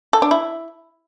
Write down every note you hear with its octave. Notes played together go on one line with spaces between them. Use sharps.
A4
D4
E4